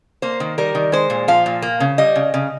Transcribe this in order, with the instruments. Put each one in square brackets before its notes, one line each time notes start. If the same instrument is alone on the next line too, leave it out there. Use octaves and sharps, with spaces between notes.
[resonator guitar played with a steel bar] A#3 C5
D#3
G3 A#4
D#3
G#3 C5
A#2
F3 F5
A#2
A#3
C#3
G3 D#5
C#3
C#3